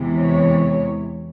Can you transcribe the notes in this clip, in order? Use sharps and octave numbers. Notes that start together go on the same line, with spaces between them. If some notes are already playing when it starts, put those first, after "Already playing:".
Already playing: E2 C3 E3 G#3
C#5